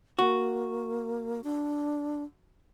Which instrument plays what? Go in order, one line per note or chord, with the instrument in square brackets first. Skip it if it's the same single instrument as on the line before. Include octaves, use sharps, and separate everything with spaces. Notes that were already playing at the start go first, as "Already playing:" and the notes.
[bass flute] A#3 [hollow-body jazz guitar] F#4
[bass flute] D4